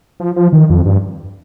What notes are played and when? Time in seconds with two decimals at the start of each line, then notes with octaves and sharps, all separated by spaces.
0.20 F3
0.36 F3
0.53 D#3
0.70 F2
0.86 G2